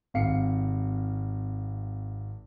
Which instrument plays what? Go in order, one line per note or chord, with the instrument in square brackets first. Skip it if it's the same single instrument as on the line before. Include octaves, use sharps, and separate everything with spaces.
[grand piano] G#1 C3 F5 C7 C#7